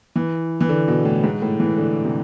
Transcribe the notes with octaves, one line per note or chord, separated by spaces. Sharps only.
E3
E3
D3
B2
A2
G#2
A2
E3
D3
C3